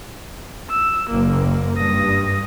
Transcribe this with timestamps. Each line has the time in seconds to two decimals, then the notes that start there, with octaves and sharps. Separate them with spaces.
0.70 E6
1.10 F#1 A#3
1.77 G2 D#6 A#6